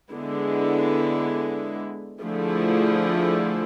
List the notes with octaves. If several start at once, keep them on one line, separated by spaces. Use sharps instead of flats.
D3 G#3 B3 E4
D3 F3 A3 E4 G#4